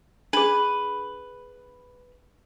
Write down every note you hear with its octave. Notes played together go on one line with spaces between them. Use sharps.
D4 G#4 B4